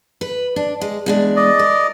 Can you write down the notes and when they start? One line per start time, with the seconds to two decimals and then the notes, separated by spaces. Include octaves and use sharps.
0.21 B4
0.56 D4
0.81 G#3
1.06 E2 G#3 D4
1.36 D5 D#5
1.59 A#4